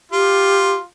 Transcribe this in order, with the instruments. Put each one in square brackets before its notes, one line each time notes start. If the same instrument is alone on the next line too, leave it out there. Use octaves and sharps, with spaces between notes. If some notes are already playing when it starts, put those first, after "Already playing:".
[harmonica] F4 [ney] G4